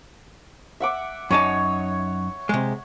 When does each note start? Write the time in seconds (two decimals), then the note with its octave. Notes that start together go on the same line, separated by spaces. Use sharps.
0.80 E5 F#5 D6
1.31 F#2 D#4 C#5 A5
2.49 C3 G#3